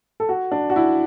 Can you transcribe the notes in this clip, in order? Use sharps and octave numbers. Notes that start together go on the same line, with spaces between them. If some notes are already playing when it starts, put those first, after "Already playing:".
A4
F#4
D4
F#4
E4